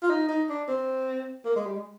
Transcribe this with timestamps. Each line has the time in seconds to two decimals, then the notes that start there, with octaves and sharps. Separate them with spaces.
0.02 F4
0.10 D#4
0.29 D#4
0.49 D4
0.68 C4
1.45 A#3
1.56 G#3
1.66 G3
1.75 G#3